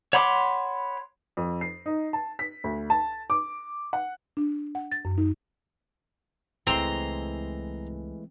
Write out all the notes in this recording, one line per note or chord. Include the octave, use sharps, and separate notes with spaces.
C#5 F#5 B5 C6 D6
F2
C7
D#4
A5
B6
D2
A5
D6
F#5
D4
F#5
A6
F#2
D#4
C#2 E3 G#3 A3 C4 E4 A#5 C6